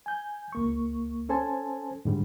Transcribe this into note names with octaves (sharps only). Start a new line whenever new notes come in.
G#5 G6
C#2 A#3 C#6
C#4 A4 C5 G#5 A5
G#2 D3 G3